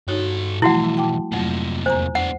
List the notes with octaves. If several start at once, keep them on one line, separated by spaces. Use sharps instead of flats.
G2 D#4 F#4 A4 C#5
B1 E3 F3 G3 A3 E4 F#4 F#5
G5 A5 D6
F2 C3 F#3 A3 A#3
E2 C5 G#5 A#5
B3 D4 F#5